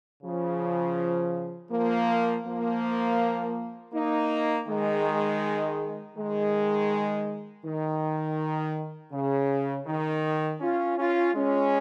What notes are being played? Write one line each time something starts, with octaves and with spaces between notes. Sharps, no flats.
C#3 F3
F3 A#3
F3 A#3
A#3 D#4
D#3 G#3
D#3 G#3
D#3
C#3
D#3
C#4 F4
C#4 F4
G#3 C#4